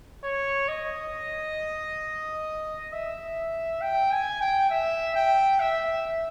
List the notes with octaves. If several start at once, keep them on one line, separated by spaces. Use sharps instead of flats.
C#5
D#5
E5
G5
G#5
G5
E5
G5
E5